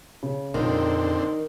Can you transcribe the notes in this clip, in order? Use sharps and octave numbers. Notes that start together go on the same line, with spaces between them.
C#3
F2 A#2 D3 D#3 C4